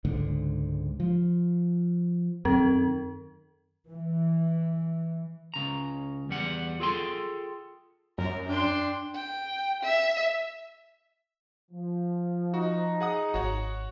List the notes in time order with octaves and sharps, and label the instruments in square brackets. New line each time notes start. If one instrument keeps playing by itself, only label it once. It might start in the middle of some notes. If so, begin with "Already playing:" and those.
[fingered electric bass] C#2 G#2 D3
F3
[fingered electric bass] F#2 D#3 [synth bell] C4 A#4
[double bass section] E3
[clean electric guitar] C#2 C#3 A#5
E2 G3 F#5
F4 G#4 A4 G5 C6
[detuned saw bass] F#2 [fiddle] A#4
[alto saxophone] D4 [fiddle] G5 C6
[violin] G5
E5
[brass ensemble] F3
[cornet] D#4 [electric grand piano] F#4
[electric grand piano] G#4 F#5 D#6
[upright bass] G#1 [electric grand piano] F#4 C#5 F#5